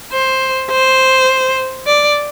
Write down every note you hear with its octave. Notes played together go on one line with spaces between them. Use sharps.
C5
C5
D5